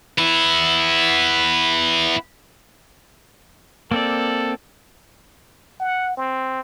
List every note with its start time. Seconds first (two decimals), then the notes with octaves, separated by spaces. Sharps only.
0.18 B3 E4
3.91 A#3 C4 A4 D5
5.80 F#5
6.17 C4